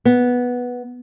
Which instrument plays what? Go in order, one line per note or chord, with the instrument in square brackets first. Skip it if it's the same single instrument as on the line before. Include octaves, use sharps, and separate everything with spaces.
[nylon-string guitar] B3